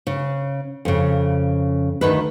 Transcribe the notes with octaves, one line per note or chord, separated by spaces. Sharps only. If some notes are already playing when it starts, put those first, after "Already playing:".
C#3
F2 C#3
D2 D#3 B4